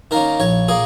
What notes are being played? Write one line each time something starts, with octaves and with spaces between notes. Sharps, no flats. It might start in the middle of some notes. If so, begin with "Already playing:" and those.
D#3 A#3 C#4 A#4
A#1 C#5
A#2 A#3 G#4